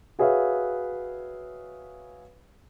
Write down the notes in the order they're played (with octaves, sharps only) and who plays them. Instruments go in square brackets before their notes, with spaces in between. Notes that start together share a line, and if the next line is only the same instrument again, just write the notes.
[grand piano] F#4 G#4 B4 C#5 E5 F5